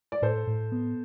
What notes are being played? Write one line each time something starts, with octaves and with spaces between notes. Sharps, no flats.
D5
A2 A4 C5
A2
B3